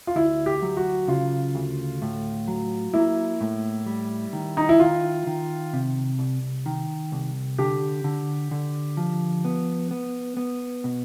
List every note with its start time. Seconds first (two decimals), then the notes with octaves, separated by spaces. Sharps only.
0.07 F4
0.15 D2 E4
0.46 G4
0.62 F#3
0.77 F#4
1.08 C#3 F4
1.55 D2
2.02 A2
2.48 F#3
2.94 A#3 E4
3.41 A2
3.86 G3
4.33 D#3
4.57 D#4
4.69 E4
4.80 D#3 F4
5.27 D#3
5.73 C3
6.19 C2
6.66 D#3
7.12 C2
7.58 D3 G4
8.04 D3
8.51 D3
8.97 F3
9.45 B3
9.91 B3
10.37 B3
10.84 B2